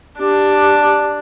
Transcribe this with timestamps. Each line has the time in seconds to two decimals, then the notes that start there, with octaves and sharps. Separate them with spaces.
0.19 D4 G4